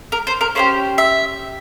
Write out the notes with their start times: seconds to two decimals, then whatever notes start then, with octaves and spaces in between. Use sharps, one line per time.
0.12 A#4
0.27 C5
0.41 A#4
0.55 C#4 E4 G4 C5
0.98 E5